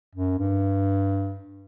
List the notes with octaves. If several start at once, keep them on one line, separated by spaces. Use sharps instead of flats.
F#2
G2